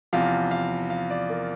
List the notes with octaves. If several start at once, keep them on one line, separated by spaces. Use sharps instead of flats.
E2 C3 F3 F5
F5
F5
D5
A#4